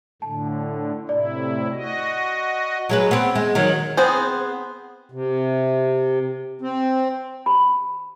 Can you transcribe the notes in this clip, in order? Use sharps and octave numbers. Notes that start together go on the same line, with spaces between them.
A2 D3 A5
A2 C3 E4 D5
F#4 D#5
F#3 G#3 B4
B3 C4
G#3
D#3 F#3
B3 C4 G#4 C5
C3
C4
B5